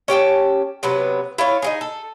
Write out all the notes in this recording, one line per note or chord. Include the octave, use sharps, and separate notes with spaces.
C#4 G4 G5 A5
C3 F#3 B3 B4
E4 F4 C#5
D#4 F#4 G#4
A4